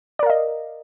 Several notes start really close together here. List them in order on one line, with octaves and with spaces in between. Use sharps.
D5 A#4 F5 D#5